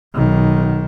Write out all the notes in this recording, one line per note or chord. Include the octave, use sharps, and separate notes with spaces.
B1 D#3